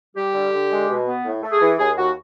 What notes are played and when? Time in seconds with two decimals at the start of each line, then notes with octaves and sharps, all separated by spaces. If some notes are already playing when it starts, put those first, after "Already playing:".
0.15 G3 G4
0.33 D3
0.52 D3
0.70 G#3
0.88 B2
1.06 B3
1.24 A2
1.42 A3
1.51 G#4
1.60 E3
1.77 D#2 G#4
1.96 D#2 F#4